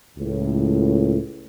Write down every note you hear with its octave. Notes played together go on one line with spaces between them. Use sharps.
C#2 A2